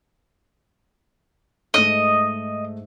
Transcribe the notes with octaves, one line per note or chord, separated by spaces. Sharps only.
G#2 A3 D#5